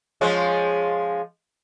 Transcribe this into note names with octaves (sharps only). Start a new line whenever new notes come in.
F3 G#3 C#4